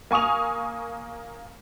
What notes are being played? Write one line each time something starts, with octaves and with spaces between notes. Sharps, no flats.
A#3 G#5 C#6 D#6 F7